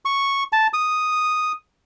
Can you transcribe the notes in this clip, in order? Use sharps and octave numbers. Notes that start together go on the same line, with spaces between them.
C#6
A5
D#6